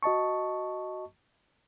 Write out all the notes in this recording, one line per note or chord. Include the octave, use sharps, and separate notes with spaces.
F#4 D#5 A5 C#6